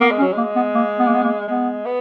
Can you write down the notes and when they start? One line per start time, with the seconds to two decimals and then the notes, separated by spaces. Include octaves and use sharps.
0.01 A#3 B3
0.11 G#3
0.19 C#4
0.22 F#3
0.33 G#3 A#3
0.56 B3
0.75 A#3
0.99 B3
1.07 A#3
1.14 B3
1.24 A#3
1.48 G#3 B3
1.86 B3